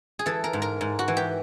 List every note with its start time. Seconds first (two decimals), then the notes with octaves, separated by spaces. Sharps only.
0.19 G#4
0.26 E3 A4
0.44 A#4
0.53 G#2
0.62 A#4
0.81 G#2
0.99 F#4
1.08 E3
1.17 G4